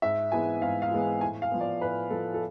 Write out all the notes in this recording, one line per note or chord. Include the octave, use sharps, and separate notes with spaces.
G#2 E5
E3 G#3 B3 G#5
G#2 F5
F5
E3 G#3 B3
A2 G#5
F5
F3 B3
D5
A2 B4
F3 B3 A4
A4